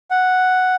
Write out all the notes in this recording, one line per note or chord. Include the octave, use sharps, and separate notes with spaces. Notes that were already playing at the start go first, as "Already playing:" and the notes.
F#5